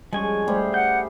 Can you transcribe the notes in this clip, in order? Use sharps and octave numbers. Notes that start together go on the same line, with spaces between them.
F3 G3 G#3 C#4 G#5 C#6
G3 A3 G#4 C5
F#5 G6